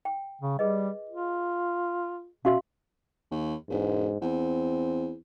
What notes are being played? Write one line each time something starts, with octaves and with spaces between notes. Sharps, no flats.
G5
C#3
G3 G#4 B4 D#5
F4
B2 C#4 F#4 E5 F5 C6
D#2
E1 G#2
E2 C4